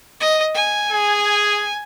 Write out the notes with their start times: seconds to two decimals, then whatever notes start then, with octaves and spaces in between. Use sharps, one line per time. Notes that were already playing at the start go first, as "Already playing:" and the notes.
0.20 D#5
0.54 G#5
0.92 G#4